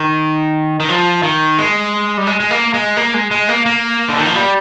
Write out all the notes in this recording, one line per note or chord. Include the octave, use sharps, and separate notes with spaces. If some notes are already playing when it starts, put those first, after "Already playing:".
Already playing: D#3
D#3
F3
D#3
G#3
G3
G#3
G#3
A#3
G#3
A#3
G#3
G#3
A#3
A#3
D3
D#3
F3
G3